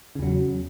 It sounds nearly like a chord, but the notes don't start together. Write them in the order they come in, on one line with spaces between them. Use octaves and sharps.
C#3 E2 F#3